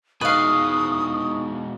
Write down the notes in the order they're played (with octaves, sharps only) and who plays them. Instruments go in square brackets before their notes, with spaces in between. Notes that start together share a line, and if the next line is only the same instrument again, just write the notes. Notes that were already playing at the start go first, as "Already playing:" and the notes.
[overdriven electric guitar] B2 G#3 [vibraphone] D#4 D#5 C#6 [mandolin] B4 F5 [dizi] D#6